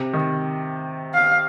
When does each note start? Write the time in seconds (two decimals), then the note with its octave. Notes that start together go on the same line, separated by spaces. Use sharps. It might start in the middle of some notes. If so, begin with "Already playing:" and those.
Already playing: C3
0.13 D#3
1.14 F5